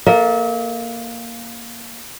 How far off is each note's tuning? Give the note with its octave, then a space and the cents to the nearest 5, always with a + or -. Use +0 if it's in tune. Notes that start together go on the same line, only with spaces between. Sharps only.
A#3 +0 A4 +0 E5 -40